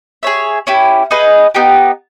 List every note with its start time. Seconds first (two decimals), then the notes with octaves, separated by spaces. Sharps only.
0.23 G#4 C#5 E5
0.67 C#4 E4 G4
1.11 D#4 G#4 B4 D#5
1.55 B3 D#4 G4